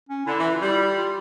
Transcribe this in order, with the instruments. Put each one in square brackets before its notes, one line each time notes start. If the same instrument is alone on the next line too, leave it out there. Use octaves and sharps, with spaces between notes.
[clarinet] C#4
[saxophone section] D3 [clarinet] E4
[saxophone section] E3
[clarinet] F4
[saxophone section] G3 [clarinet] E4
[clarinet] F4